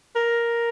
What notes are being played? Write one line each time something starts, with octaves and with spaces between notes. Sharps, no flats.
A#4